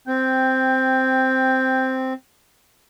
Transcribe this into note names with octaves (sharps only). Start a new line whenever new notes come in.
C4 G5